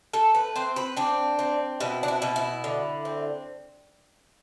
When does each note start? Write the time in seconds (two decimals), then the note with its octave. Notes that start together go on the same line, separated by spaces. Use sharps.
0.13 A3 A4
0.35 B4
0.56 C4 C5
0.76 B4
0.97 C4 D4
1.39 C4
1.80 B2 E4
2.03 D4
2.08 E4
2.22 B2
2.36 E4
2.64 D3
3.05 C4